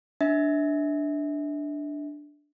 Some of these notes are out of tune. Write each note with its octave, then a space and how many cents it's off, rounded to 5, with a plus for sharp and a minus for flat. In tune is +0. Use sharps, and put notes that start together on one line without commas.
D4 +0 E5 -30